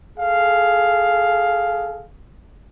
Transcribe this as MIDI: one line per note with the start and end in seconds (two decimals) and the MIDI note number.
0.18 2.06 68
0.18 2.06 69
0.18 2.06 77